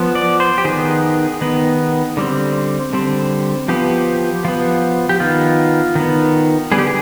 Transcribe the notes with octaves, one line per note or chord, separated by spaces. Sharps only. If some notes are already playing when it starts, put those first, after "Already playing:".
Already playing: F3 B3
D5
C5
G4
D#3 B3 G#4
D#3 B3
D3 G3 C4
D3 G3 C4
F3 B3 G4
F3 B3
G4
D#3 B3 F4
D#3 B3
D3 G3 B3 G#4
G4
G#4